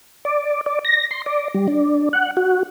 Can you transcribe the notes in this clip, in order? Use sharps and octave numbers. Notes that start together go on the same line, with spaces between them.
D5
D5
A#6
C6
D5
G3
D4
F#5
F#4